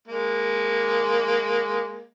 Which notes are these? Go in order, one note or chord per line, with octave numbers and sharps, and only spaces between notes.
G#3 A#3